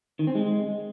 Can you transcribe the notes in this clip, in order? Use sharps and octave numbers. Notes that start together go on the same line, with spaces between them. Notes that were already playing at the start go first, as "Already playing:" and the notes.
D#3
C4
G#3